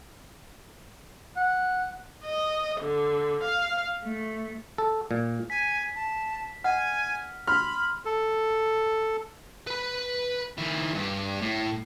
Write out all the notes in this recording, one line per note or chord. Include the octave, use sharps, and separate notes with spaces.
F#5
D#5
D3
F5
A3
A4
A#2
G#5 B6
A5
D#5 F#5 G#5 F6
B5 C6 F6
A4
B4 B5
D#3 E4
G2 G4
A2